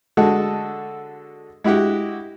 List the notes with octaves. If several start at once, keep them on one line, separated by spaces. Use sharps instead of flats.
D3 G#3 F#4 A4
G#3 E4 F#4 G4 F#5